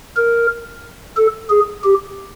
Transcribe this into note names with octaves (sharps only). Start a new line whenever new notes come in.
A#4
A4
G#4
G4